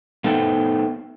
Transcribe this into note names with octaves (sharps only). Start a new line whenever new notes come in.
A3 B3 D#4 A4 C5 G5